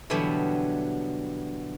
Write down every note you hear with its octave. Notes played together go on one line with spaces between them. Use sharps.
B2 D3 E3 F#3 G3 B3